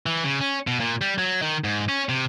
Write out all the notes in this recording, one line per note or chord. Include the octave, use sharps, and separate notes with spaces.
E3
C#3
C#4
B2
A#2
G3
F#3
D#3
G#2
C#4
C3